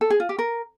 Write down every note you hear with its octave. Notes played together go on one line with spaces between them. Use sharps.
A4
G#4
F4
G4
A#4